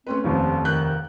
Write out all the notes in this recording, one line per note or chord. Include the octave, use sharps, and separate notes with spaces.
A3 C4 C#4 B4
F1 D#2 C3 F3
D#3 F#6 G6